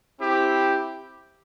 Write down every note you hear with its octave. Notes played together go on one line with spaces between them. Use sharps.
C4 E4 G4